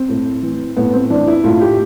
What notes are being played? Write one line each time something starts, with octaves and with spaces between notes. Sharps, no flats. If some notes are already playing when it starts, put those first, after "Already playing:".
Already playing: C4
A2
E3
A2 B3
C4
E3 D4
E4
A2 F4
G4